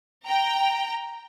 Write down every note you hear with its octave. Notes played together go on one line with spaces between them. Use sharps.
G5 A#5